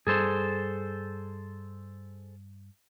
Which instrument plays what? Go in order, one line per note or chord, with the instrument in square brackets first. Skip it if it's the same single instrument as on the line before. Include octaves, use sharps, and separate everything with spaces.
[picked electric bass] G2 G3 [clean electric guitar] G#4 A4 C5